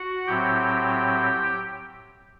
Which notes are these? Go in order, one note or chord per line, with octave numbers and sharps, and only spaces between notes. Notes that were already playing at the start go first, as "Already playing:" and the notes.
Already playing: F#4 F#5
A2 F#3 C4 G4 G5